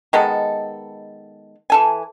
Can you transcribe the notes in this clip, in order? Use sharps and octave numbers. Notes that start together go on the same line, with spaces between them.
D#3 G#3 B3 A4
E3 A4 G#5